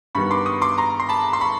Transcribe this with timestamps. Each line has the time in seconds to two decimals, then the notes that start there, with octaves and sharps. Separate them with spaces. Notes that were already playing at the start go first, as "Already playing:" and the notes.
0.15 G2 D#3 G3 B3 B5 C#6
0.31 C6 D6
0.46 C#6 D#6
0.62 C6 D6
0.78 A#5 C6
1.00 C6
1.09 A5 B5
1.33 C6
1.41 B5 C#6